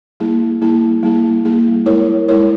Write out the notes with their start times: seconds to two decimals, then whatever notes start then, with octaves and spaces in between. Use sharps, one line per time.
0.20 G3 A#3 E4 G#4
0.62 G3 A#3 E4 G#4
1.03 G3 A#3 E4 G#4
1.45 G3 A#3 E4 G#4
1.86 G#3 E4 A#4 C#5
2.28 G#3 E4 A#4 C#5